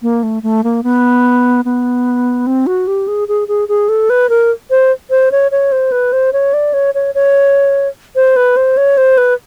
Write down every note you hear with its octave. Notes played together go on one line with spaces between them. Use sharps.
A#3
A3
A3
A#3
B3
B3
C4
F#4
G4
G#4
G#4
G#4
G#4
A4
B4
A#4
C5
C5
C#5
C#5
C5
B4
C5
C#5
D5
C#5
C#5
C#5
C5
B4
C5
C#5
C5
B4